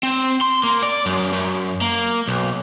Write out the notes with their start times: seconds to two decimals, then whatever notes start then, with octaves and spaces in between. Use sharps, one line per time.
0.03 C4
0.41 C6
0.63 A#3
0.83 D5
1.06 F#2
1.33 F#2
1.81 A#3
2.28 B1